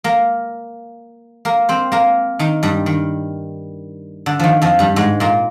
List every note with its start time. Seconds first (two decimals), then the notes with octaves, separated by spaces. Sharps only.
0.04 A#3 A#4
1.45 A#3 A#4
1.69 C4 C5
1.92 A#3 A#4
2.39 D#3 D#4
2.63 G2 G3
2.86 D#3
4.26 D3
4.40 D#3 F3
4.62 F2 F3
4.79 G2 G3
4.96 G#2 G#3
5.20 A#2 A#3